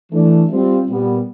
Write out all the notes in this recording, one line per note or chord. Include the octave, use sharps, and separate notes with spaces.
E3 A3 D4
G3 C4 F4
A#2 G3 B3